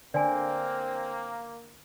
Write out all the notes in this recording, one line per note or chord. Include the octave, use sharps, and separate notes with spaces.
D3 A#3 C4 D5 G#5